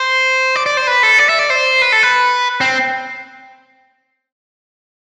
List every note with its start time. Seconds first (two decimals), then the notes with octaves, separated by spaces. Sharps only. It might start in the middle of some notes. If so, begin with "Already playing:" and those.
Already playing: C5
0.56 D5
0.66 D5
0.77 C5
0.87 B4
1.03 A4
1.19 D5
1.29 E5
1.39 D5
1.50 C5
1.82 B4
1.92 A4
2.03 B4
2.61 C4